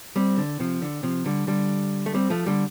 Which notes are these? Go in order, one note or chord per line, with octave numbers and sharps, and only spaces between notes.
G3 C4
D3
C3 F3
D3
C3 F3
D3 G3
D3 G3
A3
G3 C4
F3 A3
D3 G3